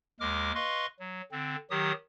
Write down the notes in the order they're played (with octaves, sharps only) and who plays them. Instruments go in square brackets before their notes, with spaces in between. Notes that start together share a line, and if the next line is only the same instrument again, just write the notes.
[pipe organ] D#2 G#3 A#4 D6 F6
B4 D#5 F5 C6 C#6
F#3
D3 C4
D#3 F#3 G4 D#6